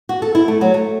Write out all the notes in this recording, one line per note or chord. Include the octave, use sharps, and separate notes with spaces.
F#4
A4
E4
A3
F#3
A3